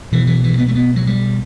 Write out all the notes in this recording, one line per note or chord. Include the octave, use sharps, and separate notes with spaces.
B1 B2 E3
E3
E3
B3
A3
B3
F#3
G3